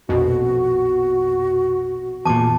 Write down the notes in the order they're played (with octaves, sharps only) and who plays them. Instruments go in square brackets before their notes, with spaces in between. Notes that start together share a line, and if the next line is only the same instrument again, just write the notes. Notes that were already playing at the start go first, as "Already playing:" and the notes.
[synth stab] A#1 F2 B2 [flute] F#4
[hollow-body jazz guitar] E2 A#2 [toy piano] A5 D6